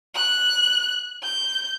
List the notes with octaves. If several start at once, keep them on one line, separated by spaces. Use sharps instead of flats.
F#6
G6